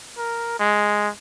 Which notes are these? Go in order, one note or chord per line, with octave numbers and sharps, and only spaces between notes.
A#4
G#3